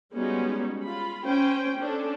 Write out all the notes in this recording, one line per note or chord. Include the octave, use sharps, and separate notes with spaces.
G3 G#3 B3 C#4 D#4 F#4
F4 B5
C#4 C5 G5
C#4 D4 A4